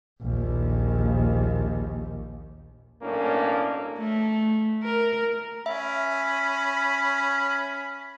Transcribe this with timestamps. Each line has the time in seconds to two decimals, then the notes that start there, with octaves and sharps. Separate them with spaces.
0.21 A#1 D#2
3.02 B1 A2 A#3 C#4 D4
3.99 A3
4.83 A#4
5.66 C#4 E5 B5